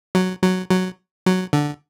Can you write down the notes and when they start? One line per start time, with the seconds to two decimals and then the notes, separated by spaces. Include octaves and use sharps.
0.15 F#3
0.43 F#3
0.70 F#3
1.26 F#3
1.53 D3